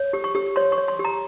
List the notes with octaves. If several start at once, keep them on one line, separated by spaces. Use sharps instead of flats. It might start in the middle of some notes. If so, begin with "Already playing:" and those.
Already playing: C#5
G4
C#6
G4
C#5 C6
C#6
C#5
C6
G4
A#5